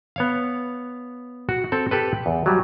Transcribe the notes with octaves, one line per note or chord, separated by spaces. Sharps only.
B3 C#5 F5
F#4
C4 A4
G4 A4 B4
E2
F#3 G3